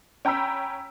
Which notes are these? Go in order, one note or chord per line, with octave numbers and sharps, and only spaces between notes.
C#4 G5 A#5 B5 E6 B6